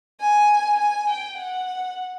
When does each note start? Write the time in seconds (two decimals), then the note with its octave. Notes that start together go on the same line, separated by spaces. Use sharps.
0.21 G#5
0.80 G#5
1.10 G5
1.39 F#5